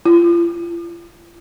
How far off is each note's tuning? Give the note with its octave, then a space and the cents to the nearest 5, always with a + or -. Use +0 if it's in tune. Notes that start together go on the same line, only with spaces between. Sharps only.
F4 -40